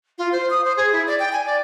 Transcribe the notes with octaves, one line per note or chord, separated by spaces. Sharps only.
F4
C5
D#6
C5
G#4
E4
D5
G5
G#5
D5